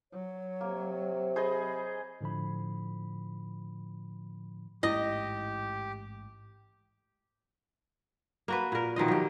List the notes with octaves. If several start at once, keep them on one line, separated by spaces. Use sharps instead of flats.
F#3 C#5
C3 A#3
G#4 C5 D#5 B5
A2 D3 F3 B5
A1 G#2 A#3 E4 G4 D#5
A#3 F#4 B4
A#2 A#4
B2 D#3 F3 D#5
F#3 G4